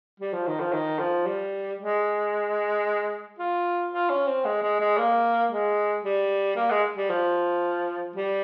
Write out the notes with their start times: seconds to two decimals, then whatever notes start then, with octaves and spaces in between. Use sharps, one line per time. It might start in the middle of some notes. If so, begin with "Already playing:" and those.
0.20 G3
0.33 F3
0.47 D#3
0.60 F3
0.73 D#3
0.99 F3
1.26 G3
1.79 G#3
3.39 F4
3.92 F4
4.10 C#4
4.27 C4
4.45 G#3
4.62 G#3
4.80 G#3
4.98 A#3
5.51 G#3
6.05 G3
6.57 A#3
6.71 G#3
6.97 G3
7.10 F3
8.16 G3